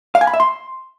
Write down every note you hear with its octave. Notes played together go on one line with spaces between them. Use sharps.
F5
G#5
B5
E5
C6